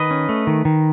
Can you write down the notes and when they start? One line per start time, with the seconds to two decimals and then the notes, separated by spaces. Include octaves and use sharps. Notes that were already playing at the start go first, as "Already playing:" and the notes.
Already playing: D#3 B4 D#5
0.11 C#4
0.29 A3
0.47 D#3
0.65 D#3